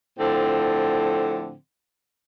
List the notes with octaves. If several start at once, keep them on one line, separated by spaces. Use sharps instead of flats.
A2 D3 F3 C4